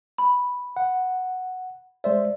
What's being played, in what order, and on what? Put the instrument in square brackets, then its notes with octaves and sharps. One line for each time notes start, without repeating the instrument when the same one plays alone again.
[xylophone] B5
[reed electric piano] F#5
[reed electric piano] G#3 C5 E5 [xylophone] D5